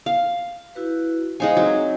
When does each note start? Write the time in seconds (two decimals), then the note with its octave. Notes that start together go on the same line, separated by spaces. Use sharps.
0.06 F5
0.75 E4 F#4 B4
1.40 G#3 D#4 C5 C#5 F5 G#5
1.57 F#3 C4 C#5